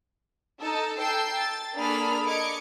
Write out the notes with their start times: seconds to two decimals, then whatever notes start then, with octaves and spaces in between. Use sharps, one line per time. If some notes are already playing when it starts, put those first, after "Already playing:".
0.60 D#4 A4
0.99 G5 A5 E6 G6 C7
1.36 A6
1.75 A#3 D4 G#4 A4 B5 F6
2.26 D#5 D6 G#6 C#7